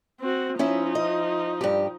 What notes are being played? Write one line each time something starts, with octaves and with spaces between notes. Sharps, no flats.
C4 F#4
F3 C#4 D#4 E4 E5
D#5
G2 G4